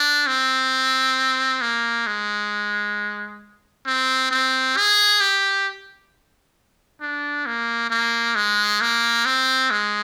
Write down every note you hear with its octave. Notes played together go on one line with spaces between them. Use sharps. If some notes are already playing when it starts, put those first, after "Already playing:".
Already playing: D4
C4
A#3
G#3
C4
C4
G#4
G4
D4
A#3
A#3
G#3
A#3
C4
G#3